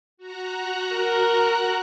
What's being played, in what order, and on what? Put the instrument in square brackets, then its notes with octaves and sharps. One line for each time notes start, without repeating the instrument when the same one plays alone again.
[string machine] F#4 A#5 F#6
[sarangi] A#4